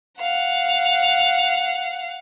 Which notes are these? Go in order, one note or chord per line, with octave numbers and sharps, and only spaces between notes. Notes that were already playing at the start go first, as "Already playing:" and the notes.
F5 F#5